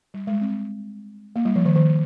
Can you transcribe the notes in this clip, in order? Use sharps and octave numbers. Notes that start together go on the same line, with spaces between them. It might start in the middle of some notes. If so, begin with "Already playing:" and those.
G3
G#3
C4
A#3
G3
F3
D#3
D#3